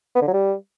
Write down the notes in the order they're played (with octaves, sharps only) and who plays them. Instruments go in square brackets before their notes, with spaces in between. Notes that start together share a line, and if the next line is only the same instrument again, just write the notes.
[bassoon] B3
D3
F#3
G3